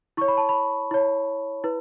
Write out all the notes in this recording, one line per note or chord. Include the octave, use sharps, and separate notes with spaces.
E4 C#5 C#6
B5
A5
B5
E4 C#5
E4 B4